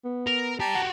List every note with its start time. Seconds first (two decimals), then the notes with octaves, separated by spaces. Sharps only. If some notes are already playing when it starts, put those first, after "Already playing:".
0.04 B3
0.27 A#4
0.60 G4 D5 A5 A#5
0.75 F#4 G4 F#5